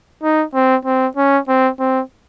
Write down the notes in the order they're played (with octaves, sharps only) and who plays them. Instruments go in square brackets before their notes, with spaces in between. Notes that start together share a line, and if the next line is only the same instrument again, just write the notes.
[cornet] D#4
C4
C4
C#4
C4
C4